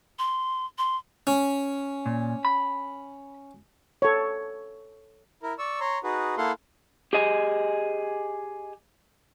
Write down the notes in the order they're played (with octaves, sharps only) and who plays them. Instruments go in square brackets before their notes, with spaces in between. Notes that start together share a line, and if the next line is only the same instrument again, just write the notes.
[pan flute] C6
C6
[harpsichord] C#4
[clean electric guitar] A#2
B5
[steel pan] A4 C#5
[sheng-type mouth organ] E4 A#4
D5 C#6 E6
C#5 A#5 C6
D#4 F#4 G#4 B4
A#3 E4 A4 F5 F#5 C6
[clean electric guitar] G4 G#4 D#5 G#5